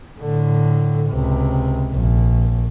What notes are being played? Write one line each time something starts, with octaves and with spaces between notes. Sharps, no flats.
A2 D3
C#2 C3
A#1